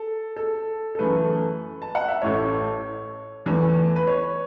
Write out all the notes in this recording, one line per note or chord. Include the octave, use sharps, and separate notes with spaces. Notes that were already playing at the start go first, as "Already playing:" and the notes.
Already playing: A4
A4
A4
F#2 E3 A3 B4
A5
F#5
E5
A1 A2 A3 C#5
E2 E3 A3
B4
C#5